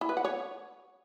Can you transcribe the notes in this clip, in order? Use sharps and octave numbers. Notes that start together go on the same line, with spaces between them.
E4
B4
F#5
C#5